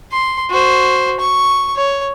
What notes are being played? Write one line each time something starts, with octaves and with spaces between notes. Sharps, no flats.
C6
F#4 C5
C#6
C#5